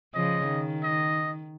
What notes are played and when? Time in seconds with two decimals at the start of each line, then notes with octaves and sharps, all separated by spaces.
0.14 C#3 F3 D#5
0.48 D#3
0.83 D#5